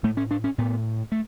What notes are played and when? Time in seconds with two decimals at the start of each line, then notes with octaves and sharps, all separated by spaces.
0.03 A2 A3
0.17 C#4
0.31 D4
0.44 C#4
0.58 A2 B3
1.12 A3